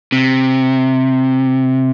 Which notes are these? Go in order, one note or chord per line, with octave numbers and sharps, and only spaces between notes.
C3